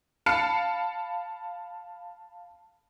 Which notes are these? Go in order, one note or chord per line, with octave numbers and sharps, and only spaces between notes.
F5 A5 B5 F6 C7 C#7